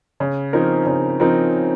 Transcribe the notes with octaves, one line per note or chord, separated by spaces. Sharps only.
C#3
F3 C4 D#4 A#4
C#3
F3 C4 D#4 A#4